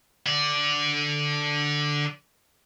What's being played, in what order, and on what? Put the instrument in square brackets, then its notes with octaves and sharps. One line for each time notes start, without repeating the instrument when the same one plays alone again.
[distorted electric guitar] D3 D5